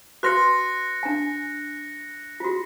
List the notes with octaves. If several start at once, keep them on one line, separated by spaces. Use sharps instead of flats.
F#4 B4 C6 F#6 A#6 C#7
D4 G#5
F4 F#4